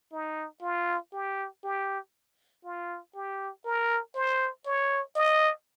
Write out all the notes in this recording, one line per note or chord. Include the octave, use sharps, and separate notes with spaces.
D#4
F4
G4
G4
F4
G4
A#4
C5
C#5
D#5